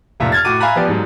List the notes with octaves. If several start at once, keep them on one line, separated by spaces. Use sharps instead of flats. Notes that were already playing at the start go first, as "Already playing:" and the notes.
F1 A#2 F4 E5 A#5
F6 G#6 A6
A2 F#4 D6 D#7
E5 F5 G#5 A#5 B5 F#6
F3 B3 G4 D5
G#2 F#3